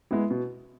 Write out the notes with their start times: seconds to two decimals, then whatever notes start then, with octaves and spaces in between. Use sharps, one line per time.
0.11 G#3 B3 E4
0.31 B2